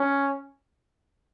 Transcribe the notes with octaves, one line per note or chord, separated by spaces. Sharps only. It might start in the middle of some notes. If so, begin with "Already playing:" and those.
Already playing: C#4